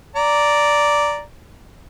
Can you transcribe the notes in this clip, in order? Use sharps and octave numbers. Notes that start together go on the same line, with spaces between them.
D5 A#5